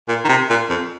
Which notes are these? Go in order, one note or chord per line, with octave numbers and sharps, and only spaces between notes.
A#2
D#3
C3
A#2
F2